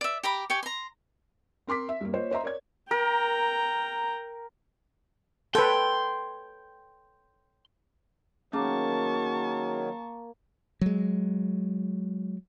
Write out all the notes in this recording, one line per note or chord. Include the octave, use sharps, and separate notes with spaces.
D5 E5
G4 A#5 B5 D6
G4 C#5 G5 G#5
A#5 C6
C4 A#4 C6 D6 B6
E5
G2 A#3
A#3 F4 C5 C#5 D#5
C5 D#5 E5 A#5 C6
A#4 C#5 D5 G#6
A#4 G5 A#5
A4 B4 C#5 G5 C6
D#3 F#3 A#3 C#4 G#4 A5 C#6
F#3 G#3